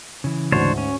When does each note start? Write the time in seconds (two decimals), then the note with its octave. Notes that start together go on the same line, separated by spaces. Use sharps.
0.24 C#3 E3
0.52 D2 G#2 D4 C5 C#5
0.78 C#4